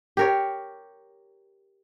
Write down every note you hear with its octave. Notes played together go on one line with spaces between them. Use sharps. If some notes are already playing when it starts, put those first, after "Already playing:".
G4 A#4 C#5